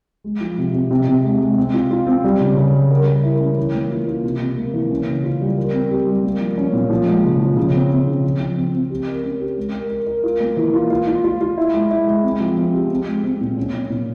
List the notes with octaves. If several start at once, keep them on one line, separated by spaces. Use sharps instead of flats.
G#3
F3
C3
C3
C3
C3
G#3
G#3
C4
F4
F4
C4
G3
C#3
C#3
G3
A#4
A#4
E4
C#4
E3
A#3
F4
F4
C3
C3
A#3
E3
C#4
C#3
F4
G3
A#4
C4
G4
G3
A#3
F3
C#4
A#2
F3
G#3
C#3
F3
C#3
C4
C4
C#3
F3
F3
C4
C4
G4
A#4
C#4
G4
G#3
A#4
A#4
A#4
F4
A#3
E3
F4
F4
F4
F4
F4
E4
G#3
E4
G#3
C4
F3
C4
G4
C4
G#3
C4
A#2
C#4
A#2
A#2